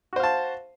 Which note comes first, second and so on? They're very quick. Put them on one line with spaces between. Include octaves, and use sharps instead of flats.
F#4 C5 F5 A5